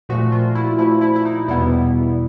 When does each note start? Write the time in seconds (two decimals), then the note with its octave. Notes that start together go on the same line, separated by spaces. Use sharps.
0.09 A#2 F3 A3 F#4
0.32 F4
0.55 E4
0.78 A#2 F3 A3 E4
1.01 E4
1.16 E4
1.25 D#4
1.48 E2 B2 G3 B3 E4